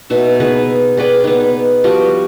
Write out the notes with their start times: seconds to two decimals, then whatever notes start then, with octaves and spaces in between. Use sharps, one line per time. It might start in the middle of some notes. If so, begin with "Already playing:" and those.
0.10 B2 D#4 E5
0.40 B3 D#4 G#4 B4
0.97 G#4 B4 D5 G5
1.24 B3 D#4
1.84 F3 G3 F#4 G4